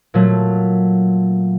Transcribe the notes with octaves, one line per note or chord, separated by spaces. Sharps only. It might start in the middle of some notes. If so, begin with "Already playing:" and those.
A#2 F#3 A3